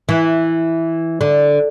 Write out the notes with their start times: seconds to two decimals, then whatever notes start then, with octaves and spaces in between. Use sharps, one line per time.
0.09 E3
1.21 D3